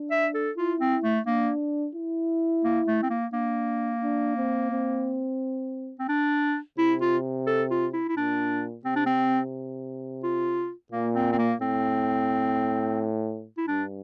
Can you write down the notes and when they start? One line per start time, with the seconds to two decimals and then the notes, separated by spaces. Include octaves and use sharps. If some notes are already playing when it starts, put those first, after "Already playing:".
Already playing: D4
0.11 E5
0.35 A4
0.57 E4 F4
0.80 C4
1.04 A3
1.26 A#3 D4
1.95 E4
2.64 A#3
2.88 A3
3.03 C4
3.10 A#3
3.33 A#3 D4
4.02 D4
4.37 C4
4.72 C4
5.99 C4
6.09 D4
6.78 C3 E4
7.01 F4
7.47 A4
7.71 F4
7.93 E4
8.09 E4
8.16 A#2 D4
8.85 C3 C4
8.96 D4
9.06 C4
10.24 F4
10.92 A#2 A#3
11.15 C4
11.33 C4
11.38 A#3
11.61 A2 C4
13.58 E4
13.68 G2 D4